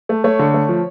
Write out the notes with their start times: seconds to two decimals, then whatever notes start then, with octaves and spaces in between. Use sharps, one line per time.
0.09 A3
0.24 A3 C#5
0.39 D3
0.54 A3
0.69 F3